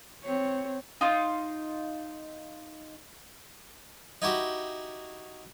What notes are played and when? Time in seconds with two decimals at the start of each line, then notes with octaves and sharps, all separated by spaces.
0.24 C4 C#5
1.01 D#4 F4
4.22 D#4 E4 F#4 G4